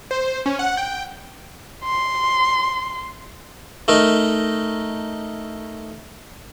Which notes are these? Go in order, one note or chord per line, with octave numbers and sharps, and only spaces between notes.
C5
C#4
F#5
G5
C6
A3 D#4 A#4